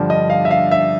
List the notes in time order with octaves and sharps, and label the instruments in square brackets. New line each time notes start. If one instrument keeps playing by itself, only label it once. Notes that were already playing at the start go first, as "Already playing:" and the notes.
Already playing: [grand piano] G2 D3 F3 D5
D#5
F5
E5
F5
E5